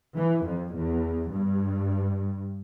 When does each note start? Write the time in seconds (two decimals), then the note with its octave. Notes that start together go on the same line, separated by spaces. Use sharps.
0.16 E3
0.45 F2
0.74 E2
1.31 G2